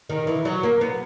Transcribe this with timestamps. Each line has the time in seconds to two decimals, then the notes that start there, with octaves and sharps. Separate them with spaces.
0.09 D#3
0.27 E3
0.45 F#3
0.63 A#3
0.81 B3